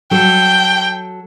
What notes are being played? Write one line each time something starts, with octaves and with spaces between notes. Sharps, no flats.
F#3 A4 G5